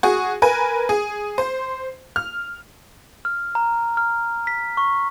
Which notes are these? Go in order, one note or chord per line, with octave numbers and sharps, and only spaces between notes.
F#4 G#4
A#4 B4 G#5
G#4
C5
F6
F6
A#5
F6
B6
C#6